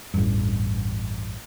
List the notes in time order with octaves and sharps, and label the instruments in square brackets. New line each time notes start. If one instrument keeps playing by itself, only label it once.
[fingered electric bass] A1 E2 G2